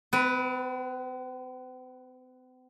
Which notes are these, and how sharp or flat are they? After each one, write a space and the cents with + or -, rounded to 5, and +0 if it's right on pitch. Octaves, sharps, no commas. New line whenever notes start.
C4 -45 B4 +5